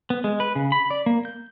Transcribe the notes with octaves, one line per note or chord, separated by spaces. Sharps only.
B3
G#3
B4
C#3
B5
D5
A#3
G6